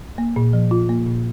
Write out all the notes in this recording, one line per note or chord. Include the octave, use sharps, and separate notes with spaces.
A#3
A#2
F3
F4
A#3
A#2